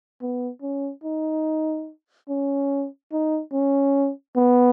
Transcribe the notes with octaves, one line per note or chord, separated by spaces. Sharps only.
B3
C#4
D#4
C#4
D#4
C#4
B3